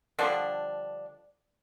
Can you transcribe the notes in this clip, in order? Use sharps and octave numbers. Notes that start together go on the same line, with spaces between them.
D3 F3 G3 D4